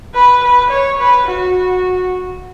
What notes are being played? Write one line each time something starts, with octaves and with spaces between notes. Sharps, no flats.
B4
B4
C#5
B4
F#4